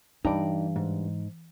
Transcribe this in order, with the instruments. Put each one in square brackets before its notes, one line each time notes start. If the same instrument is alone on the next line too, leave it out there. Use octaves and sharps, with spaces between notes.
[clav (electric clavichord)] G2 [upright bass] E3 [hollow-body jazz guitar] D#4 D5
[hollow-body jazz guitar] G#2